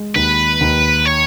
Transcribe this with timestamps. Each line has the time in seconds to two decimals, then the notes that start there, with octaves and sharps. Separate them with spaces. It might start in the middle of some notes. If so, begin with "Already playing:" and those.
Already playing: G#3
0.15 D#2 B4
0.61 D#2
1.06 C#5